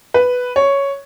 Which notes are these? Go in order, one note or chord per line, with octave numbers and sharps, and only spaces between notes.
B4
C#5